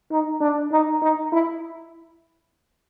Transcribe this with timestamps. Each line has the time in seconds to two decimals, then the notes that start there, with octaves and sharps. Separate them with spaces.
0.11 D#4
0.41 D4
0.72 D#4
1.02 D#4
1.32 E4